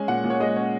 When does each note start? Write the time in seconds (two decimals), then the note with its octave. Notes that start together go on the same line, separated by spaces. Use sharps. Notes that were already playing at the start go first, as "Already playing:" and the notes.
Already playing: G#3 C#4 G#5
0.08 A#2 F#5
0.24 A#2
0.30 C#5
0.40 G#3 D#5
0.56 C#4 C#5